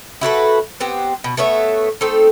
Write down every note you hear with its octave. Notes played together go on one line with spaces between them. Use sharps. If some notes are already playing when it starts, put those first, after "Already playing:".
E4 F#4 A4 B4
B3 C4 G4
B2
A3 B3 C#5 E5
A3 C4 D#4 A4